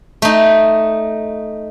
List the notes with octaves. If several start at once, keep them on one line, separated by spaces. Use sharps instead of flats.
A3 D#4